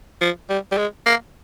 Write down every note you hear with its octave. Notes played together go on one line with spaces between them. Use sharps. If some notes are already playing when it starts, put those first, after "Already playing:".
F3
G3
G3
G#3
A#3